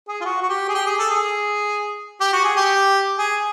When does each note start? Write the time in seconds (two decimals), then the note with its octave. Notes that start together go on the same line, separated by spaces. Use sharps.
0.08 G#4
0.21 F4
0.25 F#4
0.42 F#4
0.49 G4
0.69 G#4
0.75 G4
0.86 G#4
0.99 A4
1.10 G#4
2.20 G4
2.33 F#4
2.44 G#4
2.56 G4
3.19 G#4